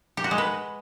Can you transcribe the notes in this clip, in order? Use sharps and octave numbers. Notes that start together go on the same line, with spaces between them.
G4
F#4
G#3
B4